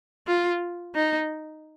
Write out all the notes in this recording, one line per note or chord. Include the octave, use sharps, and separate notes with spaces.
F4
D#4